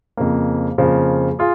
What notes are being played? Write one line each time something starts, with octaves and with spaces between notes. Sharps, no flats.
F2 C#3 F3 A#3
F2 C#3 F3 A#3
F4 G#4